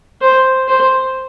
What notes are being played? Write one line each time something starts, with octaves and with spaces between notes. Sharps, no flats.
C5
C5